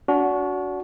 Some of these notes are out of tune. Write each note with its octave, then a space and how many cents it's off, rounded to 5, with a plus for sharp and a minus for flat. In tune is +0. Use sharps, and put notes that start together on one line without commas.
D4 -35 F#4 +0